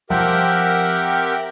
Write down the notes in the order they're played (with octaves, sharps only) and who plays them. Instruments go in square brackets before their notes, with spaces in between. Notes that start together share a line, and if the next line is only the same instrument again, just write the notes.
[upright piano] F3 [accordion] C4 G4 A#4 [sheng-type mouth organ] E5 F#5 G5